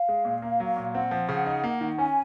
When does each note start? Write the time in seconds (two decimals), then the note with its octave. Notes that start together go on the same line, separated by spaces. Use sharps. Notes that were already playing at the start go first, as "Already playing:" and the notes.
Already playing: F5
0.09 G#3
0.25 A#2
0.42 A#3
0.60 F#3
0.77 A#2
0.94 C4 F#5
1.11 F3
1.29 C#3
1.46 D#4
1.64 A#3
1.81 D#3
1.98 C#4 G#5